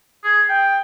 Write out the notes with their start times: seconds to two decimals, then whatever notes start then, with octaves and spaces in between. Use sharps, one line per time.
0.24 G#4
0.50 G5